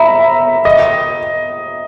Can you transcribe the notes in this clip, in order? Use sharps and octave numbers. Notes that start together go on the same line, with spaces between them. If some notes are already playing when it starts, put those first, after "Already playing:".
Already playing: E5 A#5 B5
D#5